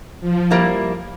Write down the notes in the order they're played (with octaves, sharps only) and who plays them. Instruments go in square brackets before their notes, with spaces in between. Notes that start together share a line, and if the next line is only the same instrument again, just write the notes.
[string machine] F3
[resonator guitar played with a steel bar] G3 A#3 E4